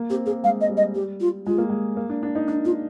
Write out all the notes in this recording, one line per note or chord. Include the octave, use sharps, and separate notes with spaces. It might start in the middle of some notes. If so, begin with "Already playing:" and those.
Already playing: A#3
C4 G4
A#3 G#4
G#3 F5
D#5
G3
D#5
G3 G4
F4
G#3 F4
A#3
G#3
A#3
D4
D4
D#4
D4 D#4
D4 F4